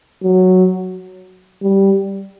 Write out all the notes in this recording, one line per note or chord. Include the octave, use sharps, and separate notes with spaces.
F#3
G3